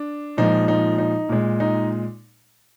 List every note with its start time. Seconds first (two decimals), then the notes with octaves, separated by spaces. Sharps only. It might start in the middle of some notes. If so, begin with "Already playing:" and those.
Already playing: D4
0.37 A#2 F3 G#3 D#4
0.68 D#4
0.98 D#4
1.29 A#2 G#3
1.60 D#4